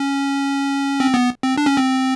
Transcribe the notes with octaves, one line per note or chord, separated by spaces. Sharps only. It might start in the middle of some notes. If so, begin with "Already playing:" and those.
Already playing: C#4
C4
B3
C4
D4
C#4
C4